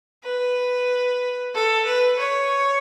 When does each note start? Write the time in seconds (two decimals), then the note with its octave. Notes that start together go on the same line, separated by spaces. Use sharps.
0.24 B4
1.54 A4
1.85 B4
2.19 C#5